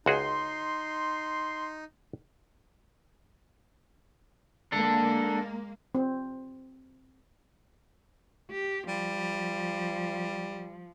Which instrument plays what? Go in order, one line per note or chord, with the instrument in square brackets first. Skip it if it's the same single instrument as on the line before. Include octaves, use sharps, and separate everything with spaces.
[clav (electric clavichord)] C#2 F#4 G#4 [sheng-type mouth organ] D#4 [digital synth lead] C6
[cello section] G#3 A#3 [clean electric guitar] D4 A4
[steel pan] C4
[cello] G4
[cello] F3 [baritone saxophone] G3